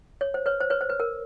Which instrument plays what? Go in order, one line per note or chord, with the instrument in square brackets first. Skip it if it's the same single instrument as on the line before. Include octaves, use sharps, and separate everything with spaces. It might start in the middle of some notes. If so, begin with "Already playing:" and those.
[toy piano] C#5
C5
B4 C#5
C5
B4 C#5
C5
B4
A#4